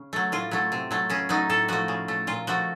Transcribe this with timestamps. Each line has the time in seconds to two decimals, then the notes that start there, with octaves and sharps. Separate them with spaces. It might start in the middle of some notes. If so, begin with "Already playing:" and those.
Already playing: C#3
0.13 F#3 A3
0.32 A2 F4
0.51 F#3 A3
0.72 C3
0.91 F#3 A3
1.10 C#3 C#4
1.29 F#3 A3 D#4
1.49 A2 A4
1.68 F3 A3 F#4
1.88 C#3
2.08 A3
2.27 A#2 F4
2.47 F3 A3 F#4